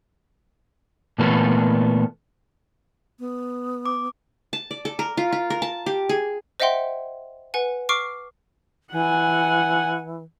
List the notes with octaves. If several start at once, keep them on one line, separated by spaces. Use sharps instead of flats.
A#2 E3 A3 B3 F4 A4
B3
D6
A5
D5
A4
A#4
F4
F4
A#4
A5
G4
G#4
C5 D#5 E5 F#5 G5 C6
B4 F#5 G#5
C#6 D6 F6 C7 D7
E3 F#5 G#5